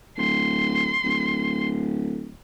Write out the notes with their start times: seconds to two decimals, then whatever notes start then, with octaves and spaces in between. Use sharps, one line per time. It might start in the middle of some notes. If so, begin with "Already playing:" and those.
0.18 D1 C6
1.04 D1